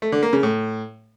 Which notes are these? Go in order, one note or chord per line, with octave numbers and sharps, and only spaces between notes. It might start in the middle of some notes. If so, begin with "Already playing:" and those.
A3
D3
A#3
C#3
A2